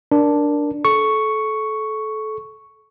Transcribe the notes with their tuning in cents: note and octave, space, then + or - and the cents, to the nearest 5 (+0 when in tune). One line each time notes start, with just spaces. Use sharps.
D4 +0 A#4 +10
A4 -25 C#6 +0